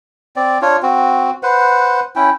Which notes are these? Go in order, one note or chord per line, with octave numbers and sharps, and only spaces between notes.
C4 D5
D4 F4 C#5
C4 F#4
B4 C5 F#5
C#4 E4 G5